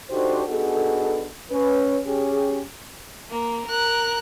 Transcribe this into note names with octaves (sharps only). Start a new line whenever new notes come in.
D4 D#4 F#4 G4 A4 C5
B3 D4 D#4 F#4 G#4 A4
C#4 B4
C#4 G4 G#4
A#3
A#4 F#6